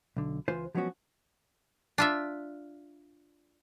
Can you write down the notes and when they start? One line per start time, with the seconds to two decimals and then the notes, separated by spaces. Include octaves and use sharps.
0.17 B1 D3
0.48 C#2 E3 F4 B4 C5 G#5
0.75 F3 F#3 G#3 B3 C#4 F#4
1.98 D4 F4 E5